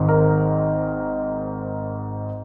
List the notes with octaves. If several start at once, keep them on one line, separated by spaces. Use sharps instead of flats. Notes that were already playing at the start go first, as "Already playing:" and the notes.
Already playing: G#1 G#2 D#3
A#4